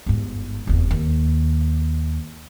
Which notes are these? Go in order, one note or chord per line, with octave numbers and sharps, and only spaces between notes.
G1 G#2
F1 E2
D#2